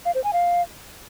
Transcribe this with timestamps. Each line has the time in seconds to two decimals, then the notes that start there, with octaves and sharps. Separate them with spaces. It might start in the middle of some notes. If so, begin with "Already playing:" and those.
0.05 F5
0.15 C5
0.24 G#5
0.33 F5